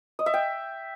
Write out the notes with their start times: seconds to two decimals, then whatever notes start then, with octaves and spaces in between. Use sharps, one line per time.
0.19 D#5
0.26 E5
0.34 G5